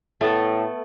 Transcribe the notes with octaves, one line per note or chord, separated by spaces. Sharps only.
A2 A3 B3 A4